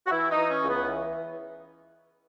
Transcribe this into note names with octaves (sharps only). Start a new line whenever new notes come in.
F#4
E3 E4
D#4
E3
C#4
C#2
B3
E3